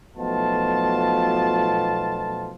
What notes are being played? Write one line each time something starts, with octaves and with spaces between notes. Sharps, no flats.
B1 B2 F3 A3 F4 A5